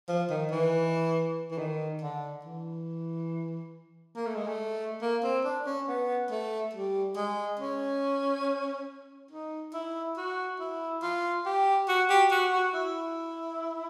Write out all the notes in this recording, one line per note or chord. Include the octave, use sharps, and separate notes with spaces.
F3
D#3
E3
E3
D#3
D3
E3
A#3
A3
G#3
A3
A#3
C4
D4
C#4
B3
A3
G3
G#3
C#4
D#4
E4
F#4
E4
F4
G4
F#4
G4
F#4
F#4
E4